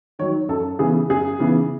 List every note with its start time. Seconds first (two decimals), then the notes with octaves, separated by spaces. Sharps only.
0.19 D#3 F#3 C#5
0.49 F#2 A4
0.79 C#3 E3 B3 G#4
1.10 F#2 G#4
1.40 C#3 E3 B3